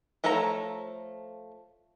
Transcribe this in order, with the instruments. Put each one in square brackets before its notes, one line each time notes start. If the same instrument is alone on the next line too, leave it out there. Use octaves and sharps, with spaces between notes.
[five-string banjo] F3 A3 A4 C#5 A#5